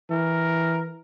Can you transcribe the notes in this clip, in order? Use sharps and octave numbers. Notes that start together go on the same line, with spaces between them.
E3 A#4